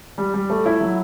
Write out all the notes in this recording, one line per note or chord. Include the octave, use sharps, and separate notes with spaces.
G3
G3
A3
E4
F#3